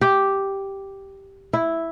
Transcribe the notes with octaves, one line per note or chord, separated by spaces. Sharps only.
G4
E4